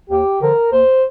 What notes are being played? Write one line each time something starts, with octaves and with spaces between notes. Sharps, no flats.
D#2 G4
D3 F3 A#4
D#2 C5